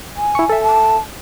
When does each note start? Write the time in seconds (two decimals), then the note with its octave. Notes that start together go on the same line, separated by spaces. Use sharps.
0.16 G#5
0.35 E4 C#6
0.50 A4 E5
0.62 A5